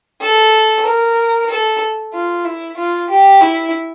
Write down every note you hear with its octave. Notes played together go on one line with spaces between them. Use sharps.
A4
A#4
A4
F4
E4
F4
G4
E4